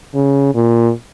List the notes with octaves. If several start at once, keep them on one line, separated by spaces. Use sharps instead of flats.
C#3
A#2